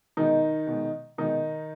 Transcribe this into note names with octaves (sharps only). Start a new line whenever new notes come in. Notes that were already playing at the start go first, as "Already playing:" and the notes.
B2 D#3 G#3 D#4
B2 G#3
B2 D#3 G#3 D#4